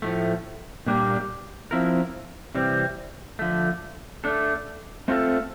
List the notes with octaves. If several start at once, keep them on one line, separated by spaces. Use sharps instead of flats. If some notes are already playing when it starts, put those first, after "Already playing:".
A2 F3 A3
A#2 G3 A#3 D4 G4
F3 C4 E4 A#4
C3 E3 G3 C4
D3 F3 A3
A3 D4 A4
A3 C4 F4 A4